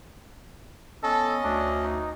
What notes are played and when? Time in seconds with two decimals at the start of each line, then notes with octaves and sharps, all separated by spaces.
1.03 B3 C#4 A4 D#5
1.44 D2 D4
1.83 D#4